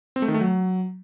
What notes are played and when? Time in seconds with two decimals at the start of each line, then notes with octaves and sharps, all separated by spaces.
0.16 C4
0.22 A3
0.28 D#3
0.34 A3
0.41 F#3